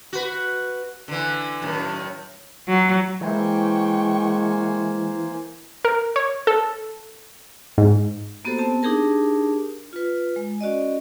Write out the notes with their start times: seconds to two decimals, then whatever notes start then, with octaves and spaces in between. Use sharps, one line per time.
0.13 F#4 B4
1.08 D3 E3
1.62 F#2 A2 D#3
2.68 F#3
3.21 E3 G#3 A#3 C5 G5 G#5 C#6
5.85 A#4
6.16 C#5
6.47 A4
7.78 G#2
8.45 A#3 B3 F#4 G4 A4 C5
8.58 B3 C4 G4 A5
8.82 D4 D#4 G4 G#4 A#4 A5
9.93 F4 B4
10.36 G#3
10.61 C#4 F#4 D5 D#5